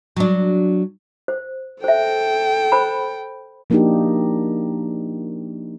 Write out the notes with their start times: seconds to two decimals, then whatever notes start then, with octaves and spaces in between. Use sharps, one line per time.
0.16 F#3 D4
1.28 C5
1.84 A4 C5 E5 G5
2.72 C5 B5
3.70 F3 A#3 D4 D#4 F#4 G4